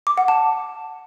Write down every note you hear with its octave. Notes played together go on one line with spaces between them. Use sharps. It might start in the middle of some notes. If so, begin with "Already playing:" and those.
D6
F#5
A5